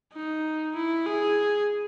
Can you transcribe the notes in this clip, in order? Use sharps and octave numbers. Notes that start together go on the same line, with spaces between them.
D#4
E4
G#4